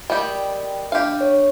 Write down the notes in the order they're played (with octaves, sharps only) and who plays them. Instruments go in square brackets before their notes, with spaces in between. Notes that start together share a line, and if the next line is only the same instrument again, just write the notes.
[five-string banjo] G3 G4 [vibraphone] A#4 G5 B5 [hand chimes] D#5
[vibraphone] D4 D#5 [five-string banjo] G4 F5
[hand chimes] C#5